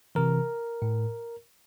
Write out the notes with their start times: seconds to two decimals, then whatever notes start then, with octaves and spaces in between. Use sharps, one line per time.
0.15 C3 E3 A#4
0.82 A2